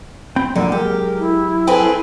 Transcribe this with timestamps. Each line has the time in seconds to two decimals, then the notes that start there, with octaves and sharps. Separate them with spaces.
0.36 C4 G5 B5
0.56 F2 A#2 D3 F#3
0.72 G#3 G4 A#4
1.19 E4
1.67 C4 G#4 A4 B4 G5